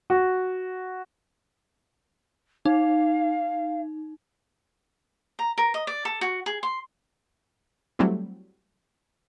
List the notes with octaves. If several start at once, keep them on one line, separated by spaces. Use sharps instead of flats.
F#4
D#4 F5
A#5
A#4
D#5
D5
A4
F#4
G#4
C6
F#3 G3 A3 C4 E4